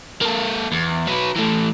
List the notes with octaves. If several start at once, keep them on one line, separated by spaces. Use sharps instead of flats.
A#3 A4
E2
F#3 B4
E3 A3